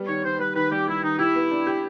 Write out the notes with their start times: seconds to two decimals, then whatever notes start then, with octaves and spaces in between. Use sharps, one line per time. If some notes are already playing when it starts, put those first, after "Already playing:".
Already playing: G3 B3
0.08 D#3 C#5
0.24 D#3 C5
0.39 G3 B4
0.56 D#3 B4
0.72 G3 G4
0.88 G3 E4
1.03 D#3 D#4
1.19 E4 G4
1.35 B3
1.51 D4
1.67 G4